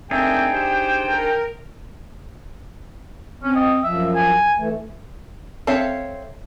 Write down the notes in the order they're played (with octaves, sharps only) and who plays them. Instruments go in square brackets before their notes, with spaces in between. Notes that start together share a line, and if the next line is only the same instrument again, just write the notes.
[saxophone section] A3 A#3 C4 [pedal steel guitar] D4 D#4 G#4 [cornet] G5
[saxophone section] G4 C5
[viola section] A#4
[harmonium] C4 [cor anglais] C#4
[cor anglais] D#5
[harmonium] F#2 F3 [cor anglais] E5
[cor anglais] G#5
[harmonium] E3 A3
[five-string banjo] C4 A4 C#5 E5 F5